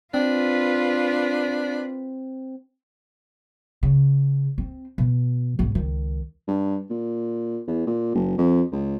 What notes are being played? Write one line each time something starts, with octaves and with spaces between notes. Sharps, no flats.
C4 D4 F4 B4
C#3
C4
B2
B1 G#2
C#2 D#3
G2
A#2
E2
A#2
F#1
F2
C#2